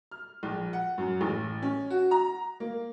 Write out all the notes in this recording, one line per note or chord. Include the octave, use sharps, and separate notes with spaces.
F6
A#1
F#5
F#2
A1
C#4
F#4
A#5
A#3